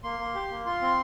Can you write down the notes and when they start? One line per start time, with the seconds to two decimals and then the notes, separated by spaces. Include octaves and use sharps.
0.03 A#3 C6
0.19 A#3
0.34 G4
0.50 A#3
0.66 F4 C6
0.81 C4